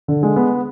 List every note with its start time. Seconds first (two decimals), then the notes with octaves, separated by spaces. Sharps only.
0.08 D3
0.23 G#3
0.36 B3